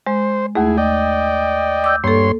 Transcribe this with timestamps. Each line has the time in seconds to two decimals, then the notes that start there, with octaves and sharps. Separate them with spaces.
0.07 G#3 C5
0.55 D#2 A3 E4 G#4
0.78 D5 D#5 G5
1.84 D6 E6 G6
2.04 G2 A#3 A4 C#5 C6